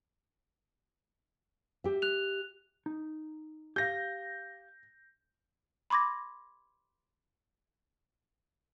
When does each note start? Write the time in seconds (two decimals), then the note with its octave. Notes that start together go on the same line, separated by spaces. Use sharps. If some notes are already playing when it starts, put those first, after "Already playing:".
1.84 G4 E5
2.02 F#6 F7
2.86 D#4
3.76 G4 F5 G6 A#6
5.90 B5 C6 D6 G#6 A#6